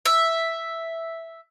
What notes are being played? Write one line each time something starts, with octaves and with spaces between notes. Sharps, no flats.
E5